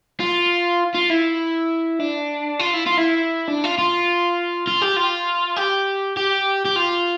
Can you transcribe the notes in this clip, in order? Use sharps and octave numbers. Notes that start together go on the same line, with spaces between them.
F4
F4
E4
D4
F4
E4
F4
E4
D4
F4
F4
F4
G4
F4
G4
G4
G4
F4